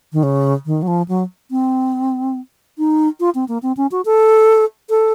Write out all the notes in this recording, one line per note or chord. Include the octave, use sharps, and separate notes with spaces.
D#3
C#3
D#3
F#3
F3
F#3
C4
D#4
F4
C4
A#3
C4
C#4
F#4
A4
A4